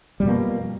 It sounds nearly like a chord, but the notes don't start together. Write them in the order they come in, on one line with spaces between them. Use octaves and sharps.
G3 F2 B2 A#3